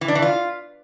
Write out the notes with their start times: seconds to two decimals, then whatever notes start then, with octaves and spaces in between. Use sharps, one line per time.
0.01 E3
0.08 D4
0.15 E3
0.22 F4